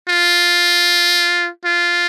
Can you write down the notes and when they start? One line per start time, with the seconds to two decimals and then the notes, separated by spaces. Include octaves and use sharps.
0.09 F4
1.65 F4